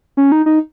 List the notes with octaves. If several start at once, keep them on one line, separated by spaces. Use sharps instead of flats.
C#4
D#4
D#4